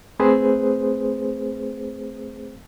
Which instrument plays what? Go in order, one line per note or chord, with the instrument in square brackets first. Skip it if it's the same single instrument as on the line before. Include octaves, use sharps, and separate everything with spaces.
[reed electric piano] A3 C4 G#4 B4 C5